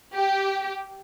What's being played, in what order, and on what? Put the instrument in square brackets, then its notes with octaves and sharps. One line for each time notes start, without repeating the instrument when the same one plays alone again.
[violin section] G4